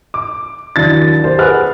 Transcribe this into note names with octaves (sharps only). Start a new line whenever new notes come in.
D6
D#2 F#3 D4 E4 D5 A6
G4 A#4 C5
G#4 B4 F#5 B5 F6 F#6